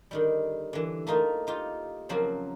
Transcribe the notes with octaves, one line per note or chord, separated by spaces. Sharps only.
D3 D#3 G3
D3 E3
A3 A#3 D#4 F4
D#4 F4 G4
C#3 F3 F#3 A#3 C4 F#4